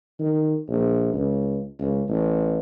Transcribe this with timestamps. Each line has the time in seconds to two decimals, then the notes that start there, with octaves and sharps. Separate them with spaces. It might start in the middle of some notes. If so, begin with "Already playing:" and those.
0.19 D#3
0.68 A#1
1.14 C#2
1.80 C#2
2.09 A1